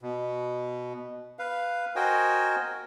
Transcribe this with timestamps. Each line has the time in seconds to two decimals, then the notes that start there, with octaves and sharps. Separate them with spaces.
0.01 B2
1.39 B4 F5
1.96 F#4 A#4 C5 D#5 G5 G#5